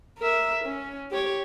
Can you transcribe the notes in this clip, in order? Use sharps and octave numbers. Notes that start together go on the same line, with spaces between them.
A#4 E5
C#4
G4 C#5